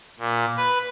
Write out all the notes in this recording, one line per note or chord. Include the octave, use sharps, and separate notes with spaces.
A#2
B4